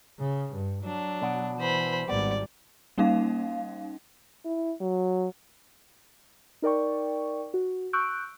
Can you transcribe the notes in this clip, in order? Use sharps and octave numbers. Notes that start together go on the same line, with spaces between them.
C#3
G2
F#3 D4
B2 D5 F#5
E3 C5 B5
G#1 G3 B3 D5
G3 A#3 C#4 D#4 F5
E4
F#3
D#4 A#4 D5 G5 C#6
F#4
C#6 E6 F#6 G6 D7